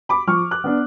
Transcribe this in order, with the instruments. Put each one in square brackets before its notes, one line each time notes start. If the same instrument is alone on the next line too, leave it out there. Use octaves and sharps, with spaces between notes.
[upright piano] B5 D6
F3 C#6 F6
D6 F#6
B3 D4